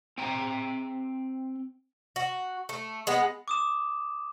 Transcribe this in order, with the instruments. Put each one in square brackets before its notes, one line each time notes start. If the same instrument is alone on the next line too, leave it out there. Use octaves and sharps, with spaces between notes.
[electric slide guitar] C4 G5 A#5
[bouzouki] F#4
A3
G#3 B3
[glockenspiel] D6 D#6 E7